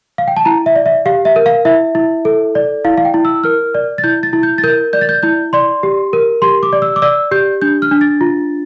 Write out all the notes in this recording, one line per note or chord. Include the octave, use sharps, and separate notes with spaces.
F5
G5
A5
E4 A#5
E5
D5
E5
G4 F5
E5
A#4
F5
E4 E5
E4
A4
D5
E4 F5
F5
G5
E4
E6
A#4 F6
D5
A6
E4 G6
A6
E4
G6
A6
A#4 G6
D5 G6
A6
G6
E4 G6
D5 C6
G4
A#4
G4 C6
D6
D5
E6
D6
D5 E6
G4 G6
D4 G6
F6
D4
A6
F4